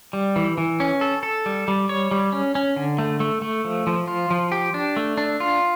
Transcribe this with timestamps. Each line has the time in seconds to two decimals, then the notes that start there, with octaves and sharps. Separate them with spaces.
0.13 G3
0.36 E3
0.58 E3
0.80 C#4
1.01 A4
1.23 A4
1.46 G3
1.68 G3
1.89 C#5
2.11 G3
2.32 C#4
2.55 C#4
2.76 D3
2.99 A3
3.20 A3
3.42 A3
3.65 F3
3.87 F3
4.08 F4
4.30 F3
4.52 G4
4.74 D4
4.97 A3
5.17 D4
5.40 F4